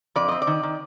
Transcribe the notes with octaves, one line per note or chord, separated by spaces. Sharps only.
F2 D5
C4 D#5
D5
D#3
D#3